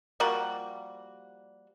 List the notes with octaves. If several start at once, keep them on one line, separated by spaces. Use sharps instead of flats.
F3 G3 A#3 F#4